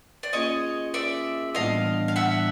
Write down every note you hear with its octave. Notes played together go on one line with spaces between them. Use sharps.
D5
A#3 C#4 F4 G#4 C#5 D#5
D5 E5
A2 E3 G3 B3 D4 D#5 F5
F5
E5 F#5